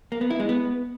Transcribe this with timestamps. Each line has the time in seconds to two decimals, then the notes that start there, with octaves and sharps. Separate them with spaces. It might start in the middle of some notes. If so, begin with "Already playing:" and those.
0.12 A#3
0.21 B3
0.30 E4
0.40 G#3
0.49 B3